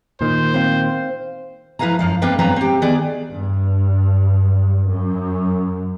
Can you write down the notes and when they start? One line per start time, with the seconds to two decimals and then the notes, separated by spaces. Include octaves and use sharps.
0.21 A#2 D#3 C5
0.54 C4 F5
1.79 F3 E4 B4 F5 G#5 A#5
1.99 F#2 F3 F5
2.22 A#3 C4 D4 B4 F5 G5
2.39 F#3 B3 C4 B4 A#5
2.56 C4 G4
2.82 D#3 B3 G#4 D5
3.30 G2
4.88 F#2